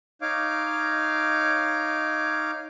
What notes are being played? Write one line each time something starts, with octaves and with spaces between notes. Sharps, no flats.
D#4 C#5 F5 D6